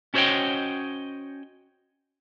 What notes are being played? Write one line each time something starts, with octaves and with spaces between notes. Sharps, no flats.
C#4 F#4 C5 C#5 D#5 G5